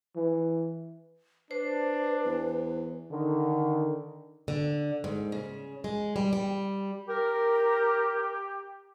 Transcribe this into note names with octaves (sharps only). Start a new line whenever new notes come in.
E3
D4 B4 C5
E2
D3 D#3
D3
G#2
C#3
G#3
G3
G3
G4 A#4